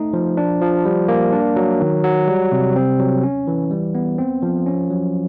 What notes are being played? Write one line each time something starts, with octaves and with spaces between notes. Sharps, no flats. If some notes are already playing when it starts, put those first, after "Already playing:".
Already playing: A3 D#4
F3
D4
F3
G3
A#3
D4
F#3
D#3
F#3
G3
C3
C4
F#3
C#4
E3
G3
B3
C4
F3
C#4
F#3